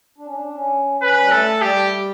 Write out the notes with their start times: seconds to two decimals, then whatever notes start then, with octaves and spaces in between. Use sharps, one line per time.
0.18 D4
0.27 C#4
0.35 D4
0.55 C#4
1.01 C#4 B4
1.20 G3
1.31 A3 A4
1.62 G3 G4